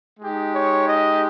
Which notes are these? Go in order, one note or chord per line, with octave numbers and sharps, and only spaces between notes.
G#3 D#4 G4
C#5
D#5